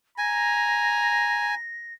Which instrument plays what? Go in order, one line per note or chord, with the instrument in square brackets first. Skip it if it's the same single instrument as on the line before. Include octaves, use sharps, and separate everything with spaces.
[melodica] G#5 [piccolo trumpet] A#5 [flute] A#6